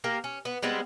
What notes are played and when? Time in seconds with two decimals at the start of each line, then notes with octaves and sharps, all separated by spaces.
0.04 A#3 G4 A#4
0.24 C#4
0.45 B3
0.62 G3 G#3 B3 C4